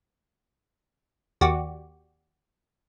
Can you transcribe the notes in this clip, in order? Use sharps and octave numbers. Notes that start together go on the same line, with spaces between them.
D#2 F#4 G4 D5